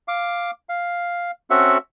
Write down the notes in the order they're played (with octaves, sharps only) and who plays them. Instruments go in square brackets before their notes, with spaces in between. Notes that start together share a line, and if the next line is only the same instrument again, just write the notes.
[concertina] F5 D6
F5
C4 C#4 F#4 A4 E5 F#5